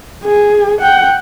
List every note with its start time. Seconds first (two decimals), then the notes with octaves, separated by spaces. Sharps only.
0.24 G#4
0.81 F#5 G5